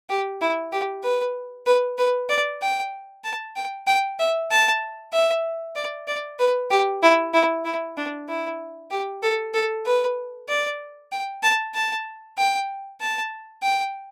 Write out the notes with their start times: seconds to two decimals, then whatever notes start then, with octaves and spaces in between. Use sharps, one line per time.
0.10 G4
0.41 E4
0.72 G4
1.04 B4
1.66 B4
1.98 B4
2.30 D5
2.62 G5
3.24 A5
3.56 G5
3.87 G5
4.19 E5
4.51 A5
5.13 E5
5.76 D5
6.08 D5
6.39 B4
6.71 G4
7.03 E4
7.34 E4
7.65 E4
7.97 D4
8.29 E4
8.91 G4
9.23 A4
9.54 A4
9.86 B4
10.49 D5
11.12 G5
11.43 A5
11.75 A5
12.38 G5
13.01 A5
13.63 G5